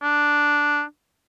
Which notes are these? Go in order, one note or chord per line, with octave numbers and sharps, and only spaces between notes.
D4